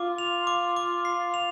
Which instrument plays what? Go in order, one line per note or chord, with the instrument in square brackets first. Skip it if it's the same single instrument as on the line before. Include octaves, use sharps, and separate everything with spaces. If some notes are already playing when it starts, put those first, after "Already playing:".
Already playing: [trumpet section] F4 [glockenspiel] D6
[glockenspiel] F7
D6
D6
C7
F7